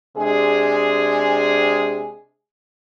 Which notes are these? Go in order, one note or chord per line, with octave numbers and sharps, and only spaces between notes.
C3 G#3 D4 G#4